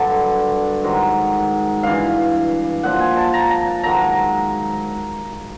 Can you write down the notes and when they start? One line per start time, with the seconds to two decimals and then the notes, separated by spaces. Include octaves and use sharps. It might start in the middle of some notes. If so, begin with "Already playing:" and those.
Already playing: G2 D3 F#3 A5
0.84 G#2 D#3 F#3
1.83 G2 E3 F5
2.83 A#2 F3 F#5
3.00 G#5
3.17 A5
3.34 A#5
3.50 A#5
3.67 A5
3.83 G#2 D#3 F#3 A#5